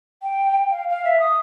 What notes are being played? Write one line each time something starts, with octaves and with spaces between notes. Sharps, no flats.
G5
F5
F5
E5
D#6